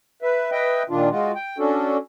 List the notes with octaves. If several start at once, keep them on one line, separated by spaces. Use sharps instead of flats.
B4 E5
B4 D#5 E5 G5
A#2 D#3 D4 F4
G#3 F4 F#4
G5
C#4 D4 F#4 A4